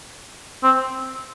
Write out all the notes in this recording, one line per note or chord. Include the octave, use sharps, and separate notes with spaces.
C4